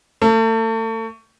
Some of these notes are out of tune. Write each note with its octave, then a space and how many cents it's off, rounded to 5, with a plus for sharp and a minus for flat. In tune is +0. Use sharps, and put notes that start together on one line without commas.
A3 +35